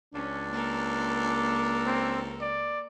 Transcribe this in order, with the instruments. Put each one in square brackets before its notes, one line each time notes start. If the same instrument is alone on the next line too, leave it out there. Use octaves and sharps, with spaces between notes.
[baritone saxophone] C#2 [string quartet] C#4 [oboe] D4
[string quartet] A#3 A4 A#4
[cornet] C4
D5